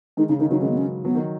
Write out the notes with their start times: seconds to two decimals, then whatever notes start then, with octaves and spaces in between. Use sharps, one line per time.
0.17 D#3 G#3 D#4
0.28 C#3 D#4
0.39 D#3 D#4
0.51 C#3 F#3 D#4
0.61 D#3 G#3 C#4
0.69 B3
0.77 C#4
1.05 F#3 B3
1.15 D#3